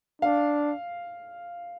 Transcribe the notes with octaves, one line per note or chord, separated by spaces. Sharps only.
D4 F5